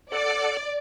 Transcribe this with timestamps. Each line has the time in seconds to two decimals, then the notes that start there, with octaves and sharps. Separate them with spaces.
0.12 A4 D5 F#5